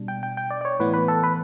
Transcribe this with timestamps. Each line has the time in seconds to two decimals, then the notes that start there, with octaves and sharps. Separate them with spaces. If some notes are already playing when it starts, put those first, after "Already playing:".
Already playing: B2 G3 D4
0.08 G5
0.23 G5
0.37 G5
0.50 D5
0.61 D5
0.65 C#5
0.80 A2 E3 B3 B4
0.94 B4
1.08 A4
1.24 B4